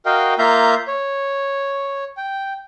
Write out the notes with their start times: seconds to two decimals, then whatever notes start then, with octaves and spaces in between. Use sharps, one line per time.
0.06 F#4 A#4 D#5 F5 G5
0.39 A#3 F4 E5 F5 A#5 G6
0.88 C#5
2.17 G5